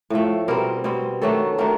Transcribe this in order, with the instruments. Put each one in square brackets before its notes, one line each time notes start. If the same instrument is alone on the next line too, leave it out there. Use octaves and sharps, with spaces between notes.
[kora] A2 F3 A3
B2 G3 C4 A#4
B2 G3 C4
D#3 F#3 A3 D4 A4
D#3 F#3 A3 D4 A#4